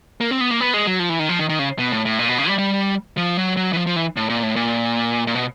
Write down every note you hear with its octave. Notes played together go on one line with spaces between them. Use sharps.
A#3
C4
B3
A#3
B3
G#3
F#3
F3
E3
D#3
F3
D#3
D#3
C#3
B2
A2
A2
A#2
B2
C#3
G3
G3
F3
F#3
F#3
E3
F3
F3
E3
A2
A#2
A2
A#2
A#2
B2